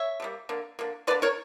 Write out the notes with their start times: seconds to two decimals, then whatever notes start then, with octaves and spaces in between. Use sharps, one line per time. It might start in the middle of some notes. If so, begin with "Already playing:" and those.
Already playing: C#5 E5
0.20 D3
0.22 G3 A#3
0.49 D3 A#3
0.79 D3 A#3
1.07 A#3 B4 D5
1.11 D3
1.22 A#4 C#5